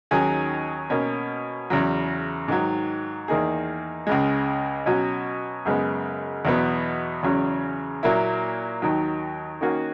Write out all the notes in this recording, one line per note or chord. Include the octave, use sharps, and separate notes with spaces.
D#2 D#3 F#3 C#4 G#4
B2 A#3 C#4
E2 C#3 F#3
G#2 D#3 F#3
E2 D#3 A#3 D#4 G#4
C#2 C#3 G#3
B2 F#3 C#4 F#4
F#2 C#3 G#3 B3
E2 B2 F#3 B3
E2 C#3 F#3 C#4
A#2 F#3 A#3 E4
D#2 D#3 F#3
D#3 A#3 C#4 F#4